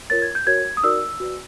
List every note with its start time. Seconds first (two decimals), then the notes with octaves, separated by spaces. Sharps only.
0.10 F4 A#4 C#5 A6
0.22 G#6
0.35 G6
0.47 F#4 A#4 C#5 G#6
0.77 D#6
0.83 D#4 F#4 A#4 D5 E6
1.20 F#4 B4 D5